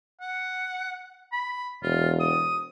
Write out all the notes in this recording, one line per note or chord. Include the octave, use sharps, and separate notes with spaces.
F#5
B5
E1 F4
D#6